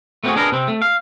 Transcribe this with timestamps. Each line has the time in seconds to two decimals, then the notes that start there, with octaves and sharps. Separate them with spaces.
0.24 A3 B3 C4 D#4 F#4 G#4
0.36 D4 G#4 A#4 B4 D#5
0.52 C3 C4
0.68 A3
0.82 F5